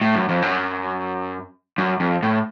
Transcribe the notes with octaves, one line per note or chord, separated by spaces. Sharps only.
A2
F#2
F2
F#2
F#2
F2
A2